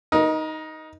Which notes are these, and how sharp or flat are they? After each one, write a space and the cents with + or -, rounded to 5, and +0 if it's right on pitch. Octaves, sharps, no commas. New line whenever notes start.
D#4 +5 A#4 +35